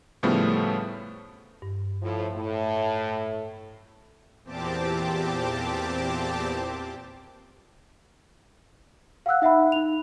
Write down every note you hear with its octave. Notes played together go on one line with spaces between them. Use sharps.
A2 C#3 F3 G3 A3 B3
G2
A2 F3
A2
E2 A#2 C4 G4 A5 D6
F5 F#5 E6 F#6
D#4 E5 F#5 B5
D#4 F7